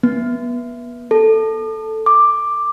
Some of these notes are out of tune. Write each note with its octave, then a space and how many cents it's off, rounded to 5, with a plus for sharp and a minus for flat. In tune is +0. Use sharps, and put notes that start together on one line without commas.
B3 -30
A4 +5
D6 +10